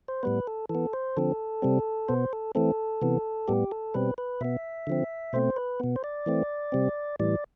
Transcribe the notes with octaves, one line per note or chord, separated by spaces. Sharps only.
C5
A2 G3 B3 B4
A4
E3 A4
B3
C5
D3 F3 C4 A4
C3 G3 C4
B2 B3 C5
A4
E3 A3 C4 A4
C3 E3 B3
A2 G3 B3 G4
A4
B2 G3 C4 B4
B4
B2 B3 E5
D3 F3 C4
B2 A3 C4 C5
B4
B2 B3
C5
D5
E3 A3 C4
C3 G3 C4
A2 E3 G3 D5